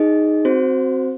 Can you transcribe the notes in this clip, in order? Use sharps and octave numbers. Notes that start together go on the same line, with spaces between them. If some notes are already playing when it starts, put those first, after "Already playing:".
Already playing: D#4 G#4 D#5
C4 F#4 C5